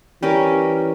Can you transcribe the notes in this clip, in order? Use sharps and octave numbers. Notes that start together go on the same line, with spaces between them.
E3 G3 C#4 G4 A#4